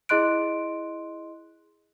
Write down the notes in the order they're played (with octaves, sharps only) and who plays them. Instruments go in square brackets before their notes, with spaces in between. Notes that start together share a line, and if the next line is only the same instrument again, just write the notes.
[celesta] E4 G#4 D#5 C6 F#6 D7